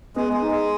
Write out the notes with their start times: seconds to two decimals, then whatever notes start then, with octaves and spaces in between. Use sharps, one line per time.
0.16 G#3 B3
0.33 G#3
0.42 D#4
0.51 G#3